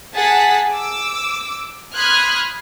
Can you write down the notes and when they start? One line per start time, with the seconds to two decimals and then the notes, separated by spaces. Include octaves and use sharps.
0.15 G#4 F#5 A5 A6 B6
0.71 D6 E6
1.93 B5 C6 D#6 F6 F#6 G#6